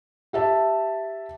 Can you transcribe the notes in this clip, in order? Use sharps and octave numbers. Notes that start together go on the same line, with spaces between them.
G4 E5 A5